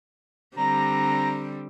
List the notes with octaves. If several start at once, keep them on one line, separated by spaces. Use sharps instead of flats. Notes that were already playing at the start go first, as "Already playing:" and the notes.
D3 G3 C4 A#5